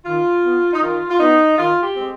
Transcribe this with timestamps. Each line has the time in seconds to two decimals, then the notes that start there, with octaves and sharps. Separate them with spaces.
0.05 D#3 F4
0.43 B3
0.73 D#4
0.82 D#3 F4
1.10 F4
1.19 B3 D#4
1.57 D#3 F4
1.83 G4
1.96 G#3 C4